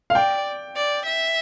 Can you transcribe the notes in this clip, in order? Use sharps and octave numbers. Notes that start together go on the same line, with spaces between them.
F5
D5 G5
D5
E5